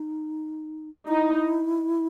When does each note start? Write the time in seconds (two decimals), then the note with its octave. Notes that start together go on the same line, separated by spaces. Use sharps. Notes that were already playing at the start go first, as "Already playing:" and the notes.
Already playing: D#4
1.08 D#4 E4